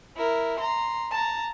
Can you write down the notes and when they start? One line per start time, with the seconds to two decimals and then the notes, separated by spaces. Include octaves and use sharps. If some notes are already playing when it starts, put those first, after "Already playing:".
0.17 E4 A#4
0.59 A#5 C6
1.12 A5 A#5